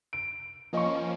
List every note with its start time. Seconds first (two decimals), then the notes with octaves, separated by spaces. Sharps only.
0.13 D7
0.73 F3 A#3 C#4 D#5 C#6